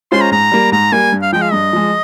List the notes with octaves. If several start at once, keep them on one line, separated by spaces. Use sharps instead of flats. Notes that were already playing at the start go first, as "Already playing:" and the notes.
G#3 C#4 F4 C5 C6
A#5
G#2 A#5
G3 A#3
G#2 A#5
G3 A#3 G#5
G2
F5
F3 G#3 G5
F5
G2 D#5
F3 G#3